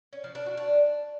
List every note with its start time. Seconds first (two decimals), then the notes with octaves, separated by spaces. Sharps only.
0.13 C#4
0.24 F3
0.35 D4
0.46 F#4
0.57 D4